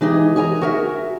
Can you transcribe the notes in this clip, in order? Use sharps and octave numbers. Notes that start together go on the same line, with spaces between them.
E3 G#3 D#4 G4 G#4
G#4 A#4 G#5 A#5
F#4 A#4 E5